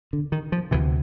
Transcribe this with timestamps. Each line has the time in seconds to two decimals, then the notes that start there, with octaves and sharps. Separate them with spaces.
0.13 D3
0.32 D#3
0.52 F3
0.71 D2 C3 E3